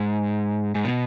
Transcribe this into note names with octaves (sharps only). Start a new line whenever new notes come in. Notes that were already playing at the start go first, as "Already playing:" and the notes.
Already playing: G#2
G#2
B2